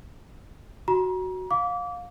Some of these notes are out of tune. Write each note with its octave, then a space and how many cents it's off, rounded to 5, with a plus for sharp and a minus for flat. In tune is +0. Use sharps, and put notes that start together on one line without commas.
F#4 +0 A#5 +35
F5 +25 D6 -25